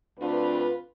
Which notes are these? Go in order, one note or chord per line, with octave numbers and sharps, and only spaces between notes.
D2 C4 D4 F4 B4